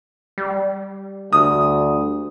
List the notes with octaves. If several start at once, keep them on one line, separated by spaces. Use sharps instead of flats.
G3
D2 D#6